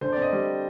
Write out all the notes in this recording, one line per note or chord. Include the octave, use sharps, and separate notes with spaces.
D3 C5
D5
C4 D#5
G3